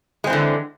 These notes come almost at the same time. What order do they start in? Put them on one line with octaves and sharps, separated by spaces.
G#3 C4 E3 D3